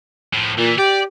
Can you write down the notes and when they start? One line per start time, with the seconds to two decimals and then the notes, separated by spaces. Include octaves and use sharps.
0.33 A2 F3
0.58 A#2 E3
0.78 G4 D5